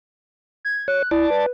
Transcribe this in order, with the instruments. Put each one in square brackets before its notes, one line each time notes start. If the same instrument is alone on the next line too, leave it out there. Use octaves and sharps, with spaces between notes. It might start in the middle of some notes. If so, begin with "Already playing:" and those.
[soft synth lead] G#6
[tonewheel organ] C#5 [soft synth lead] F#6
[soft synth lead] E4 [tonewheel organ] D5 A5
[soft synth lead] B4